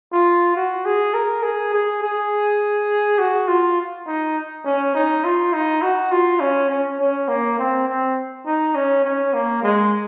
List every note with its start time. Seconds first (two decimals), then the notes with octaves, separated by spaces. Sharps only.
0.12 F4
0.56 F#4
0.85 G#4
1.14 A#4
1.43 G#4
1.73 G#4
2.03 G#4
3.19 F#4
3.48 F4
4.07 D#4
4.65 C#4
4.95 D#4
5.24 F4
5.53 D#4
5.82 F#4
6.12 F4
6.40 C#4
6.69 C#4
6.99 C#4
7.28 A#3
7.58 C4
7.87 C4
8.46 D#4
8.75 C#4
9.05 C#4
9.33 A#3
9.63 G#3